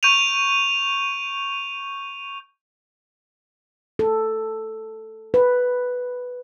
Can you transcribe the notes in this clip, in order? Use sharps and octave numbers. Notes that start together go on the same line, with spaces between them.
C#6 G6 D7 D#7 F7
A4
B4